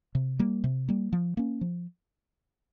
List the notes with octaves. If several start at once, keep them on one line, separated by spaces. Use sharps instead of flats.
C3
G3 A#3
C3
G3 A#3
F3
A#3 C#4
F3